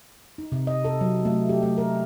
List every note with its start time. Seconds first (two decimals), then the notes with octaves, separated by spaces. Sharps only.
0.38 D#4
0.52 C3
0.67 D#5
0.85 A4
1.01 F#3
1.25 A3
1.49 G4
1.63 A3
1.78 A#4